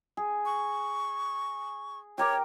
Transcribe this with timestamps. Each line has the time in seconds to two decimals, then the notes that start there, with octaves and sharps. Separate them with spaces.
0.17 G#4
0.45 C#6
2.18 G4 A#4 C#5 D6